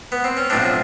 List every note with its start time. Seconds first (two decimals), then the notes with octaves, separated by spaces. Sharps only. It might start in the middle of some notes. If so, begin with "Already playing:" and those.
0.12 B3
0.24 C4
0.37 C#4
0.50 B1 A2 F3 C4 D4